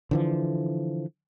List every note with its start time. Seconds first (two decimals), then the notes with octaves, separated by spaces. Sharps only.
0.11 D3 E3 F3